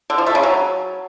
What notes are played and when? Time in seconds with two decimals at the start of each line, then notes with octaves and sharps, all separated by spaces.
0.10 D3
0.18 F3
0.27 A3
0.35 C#3
0.43 F#3